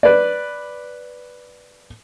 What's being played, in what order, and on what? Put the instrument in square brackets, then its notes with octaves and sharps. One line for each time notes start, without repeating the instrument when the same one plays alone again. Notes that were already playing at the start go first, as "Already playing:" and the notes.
[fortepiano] B4 D5